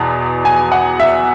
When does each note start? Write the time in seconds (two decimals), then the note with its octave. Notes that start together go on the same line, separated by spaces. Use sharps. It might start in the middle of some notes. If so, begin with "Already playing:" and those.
Already playing: E2 B2
0.45 G#5
0.72 F#5
1.00 E5